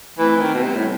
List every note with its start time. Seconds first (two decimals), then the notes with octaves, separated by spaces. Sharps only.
0.19 E3 A3 C4
0.36 E3
0.40 D#3
0.54 B2
0.63 C3 G3 B3
0.75 A2